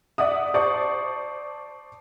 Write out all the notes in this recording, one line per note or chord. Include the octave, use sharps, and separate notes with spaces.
D5 E5 F#5 D#6
C5 D5 A5 C#6 D#6